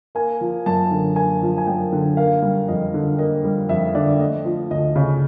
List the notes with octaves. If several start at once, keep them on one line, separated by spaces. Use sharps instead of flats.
A#3 G#5
F3
F#2 A5
D3
A#3 G#5
F3
G#5
F#2 G5
D3
A#3 F5
G3
F2 D#5
D3
A#3 D#5
G3
F2 E5
D3 D5
A3 D#5
F3
D2 D#5
C#3